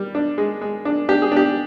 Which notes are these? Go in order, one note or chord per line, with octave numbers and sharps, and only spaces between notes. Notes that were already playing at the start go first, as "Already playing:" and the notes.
Already playing: G3
D4
G#3
G#3
D4
D4 G4
G#4
D4 G4